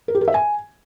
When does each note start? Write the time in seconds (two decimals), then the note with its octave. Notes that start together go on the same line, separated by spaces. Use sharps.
0.08 A#4
0.15 G4
0.21 A#4
0.28 E5
0.34 G#5